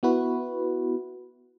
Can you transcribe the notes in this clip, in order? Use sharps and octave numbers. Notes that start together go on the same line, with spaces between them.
B3 E4 F#4 B4